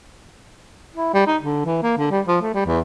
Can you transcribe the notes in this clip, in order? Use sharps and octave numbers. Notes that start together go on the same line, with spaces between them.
E4
G3
D#4
D3
E3
A#3
D3
G3
F3
A3
G3
E2